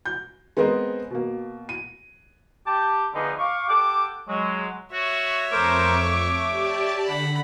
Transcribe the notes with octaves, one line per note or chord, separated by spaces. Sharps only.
G6
G#3 B3 C4 A#4 C5 D#5
B2 A#3
D#7
G4 A5 D6
D3 F3 B3 D#4 G#4 B4
F5 C#6 D6
G4 A4 F#5 D6
F#3 G#3
F#4 C#5 E5
F2 A3 A#4 C5 C#6 D6
A3
G4 D5 A5
D3 F#5 B5